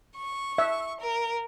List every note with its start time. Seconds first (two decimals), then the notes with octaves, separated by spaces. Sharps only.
0.16 C#6
0.58 E5
1.00 A#4